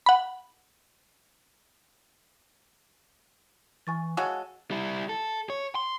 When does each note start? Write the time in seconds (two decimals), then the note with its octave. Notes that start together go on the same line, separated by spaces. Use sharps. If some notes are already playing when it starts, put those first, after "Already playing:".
0.06 F#5 B5
3.87 E3 G#5 C#6 A6
4.17 G#3 F#4 A4 C#5 F5 G#5 E6
4.71 G3 E4
5.09 A4
5.50 C#5
5.75 C6